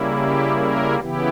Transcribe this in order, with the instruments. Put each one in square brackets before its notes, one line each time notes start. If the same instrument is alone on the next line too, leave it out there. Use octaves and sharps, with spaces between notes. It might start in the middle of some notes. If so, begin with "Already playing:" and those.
Already playing: [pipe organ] C#3 G3 A#3 E4
G4
A#4
C#3 E3 B3 E4 G4